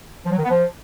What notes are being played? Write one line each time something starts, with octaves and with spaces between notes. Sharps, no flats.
F3
F#3
D#3
B3
F3